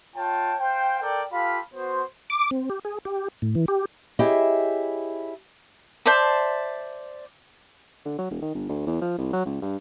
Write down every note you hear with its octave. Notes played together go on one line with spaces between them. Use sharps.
F4 C#5 G5 A5
C5 F5 G5
A4 A#4 D5 G5
F4 G4 A4 F5 B5
B3 F#4 C5
D6
C4
G4
G#4
G4
A2
E3
G4
E4 G4 G#4 C#5 D#5 E5
C5 D5 E5 A5
D3
F#3
E1
D#3
G1
D2
E2
F3
C2
F#3
C#2
G2